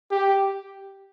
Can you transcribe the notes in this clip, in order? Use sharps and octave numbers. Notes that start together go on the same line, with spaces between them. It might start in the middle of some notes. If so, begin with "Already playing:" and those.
G4